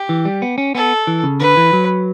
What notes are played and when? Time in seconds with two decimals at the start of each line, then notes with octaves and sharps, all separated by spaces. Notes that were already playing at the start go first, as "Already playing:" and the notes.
Already playing: G4
0.09 E3
0.25 G3
0.42 B3
0.58 C#4
0.75 B3 A4
1.07 E3
1.23 C#3
1.40 D3 B4
1.57 E3
1.73 F#3